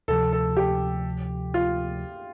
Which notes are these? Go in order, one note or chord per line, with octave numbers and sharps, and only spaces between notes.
D2 C3 F3 A4
A4
G4
F4